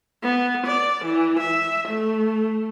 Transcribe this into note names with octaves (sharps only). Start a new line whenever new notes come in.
B3
D5
E3
E5
A3